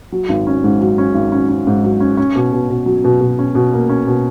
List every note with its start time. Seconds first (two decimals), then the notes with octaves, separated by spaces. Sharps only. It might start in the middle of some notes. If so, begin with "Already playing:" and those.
0.12 F#3
0.29 G#1
0.47 C#4
0.64 G#2
0.81 F#3
0.98 C#4
1.15 G#1
1.32 C#4
1.49 C#4
1.67 G#2
1.84 F#3
2.00 C#4
2.17 C#4
2.35 B2
2.53 B2
2.70 B2
2.86 F#3
3.04 B2
3.21 B2
3.39 C#4
3.55 B2
3.73 A#3
3.89 C#4
4.07 B2